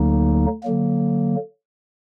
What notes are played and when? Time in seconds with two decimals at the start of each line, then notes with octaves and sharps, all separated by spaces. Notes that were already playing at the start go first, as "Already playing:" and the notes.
Already playing: D2 D3 F#3 A#3 D#4
0.64 D3 F#3 A#3